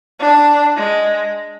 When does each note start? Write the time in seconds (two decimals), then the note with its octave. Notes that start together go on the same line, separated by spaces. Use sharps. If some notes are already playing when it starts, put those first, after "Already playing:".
0.19 D4
0.76 G#3